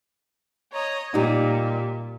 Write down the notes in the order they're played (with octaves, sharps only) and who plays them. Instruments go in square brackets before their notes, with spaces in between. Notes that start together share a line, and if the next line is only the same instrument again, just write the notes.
[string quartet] C#5 D#5 A#5
[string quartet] A#2 [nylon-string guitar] G3 D#4